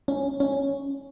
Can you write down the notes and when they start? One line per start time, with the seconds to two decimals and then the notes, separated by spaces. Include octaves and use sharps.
0.08 C#4
0.40 C#4